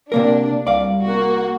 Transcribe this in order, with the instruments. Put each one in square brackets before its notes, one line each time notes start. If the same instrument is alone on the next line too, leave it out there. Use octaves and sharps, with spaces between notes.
[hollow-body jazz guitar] C3 A#3 A#4 [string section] D4
[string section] C2 [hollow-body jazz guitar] D5 F5
[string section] A#3 F#4